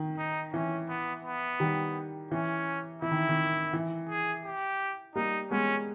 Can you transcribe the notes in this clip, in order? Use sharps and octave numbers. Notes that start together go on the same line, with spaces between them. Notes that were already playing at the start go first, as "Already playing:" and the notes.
Already playing: D#3
D#4
E3 C#4
B3
B3
D#3 G3
E3 C#4
E3 E4
D#3
D#3
E3
G#4
G4
G3 A#3 D#4
G#3 B3 C#4